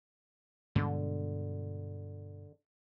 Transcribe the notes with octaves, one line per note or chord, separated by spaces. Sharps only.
G2 B2 D3 G#3